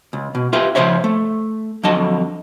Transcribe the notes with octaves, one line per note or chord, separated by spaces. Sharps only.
C#2
B2
F4 G4 B4 E5
C#3 F3 C5 C#5 E5
A3
F2 D3 F#3 F#4 D#5 A5